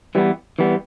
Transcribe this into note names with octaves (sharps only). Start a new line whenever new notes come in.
E3 G3 B3
E3 G3 B3